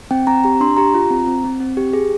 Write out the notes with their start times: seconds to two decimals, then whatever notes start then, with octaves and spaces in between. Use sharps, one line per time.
0.11 C4 G5
0.27 C4 A#5
0.44 G4 A#5
0.60 D4 C6
0.77 G4 A#5
0.94 F4
1.10 C4
1.27 C4
1.44 C4
1.60 C4
1.77 G4
1.93 G#4